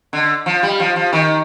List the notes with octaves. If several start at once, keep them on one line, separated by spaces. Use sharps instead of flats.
D3
F3
G3
F3
F3
D#3